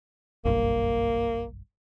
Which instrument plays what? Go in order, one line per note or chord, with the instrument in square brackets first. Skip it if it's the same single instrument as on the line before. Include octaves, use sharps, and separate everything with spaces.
[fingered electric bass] F#1 B1 G2 [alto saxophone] A#3